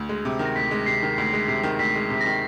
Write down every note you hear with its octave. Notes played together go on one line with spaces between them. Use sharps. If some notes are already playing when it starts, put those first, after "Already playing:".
Already playing: D2
G#3
C3
D#3
A#6
D2 B6
G#3
C3 C7
D#3
D2
G#3
C3 C7
D#3
D2 B6
G#3
C3
D#3 A#6